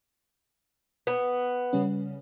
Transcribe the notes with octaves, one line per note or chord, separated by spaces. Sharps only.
B3
C#3 G3 C#4